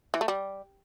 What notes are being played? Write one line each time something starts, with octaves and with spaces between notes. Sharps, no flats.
E3
A3
G3